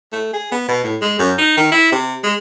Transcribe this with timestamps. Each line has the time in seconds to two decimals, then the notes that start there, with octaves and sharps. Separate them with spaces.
0.12 A3
0.33 G#4
0.52 B3
0.68 B2
0.84 A2
1.01 G#3
1.19 F#2
1.38 D#4
1.57 D#3
1.71 E4
1.92 C3
2.23 G#3